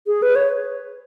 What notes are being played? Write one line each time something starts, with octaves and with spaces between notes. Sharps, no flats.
G#4
B4
C#5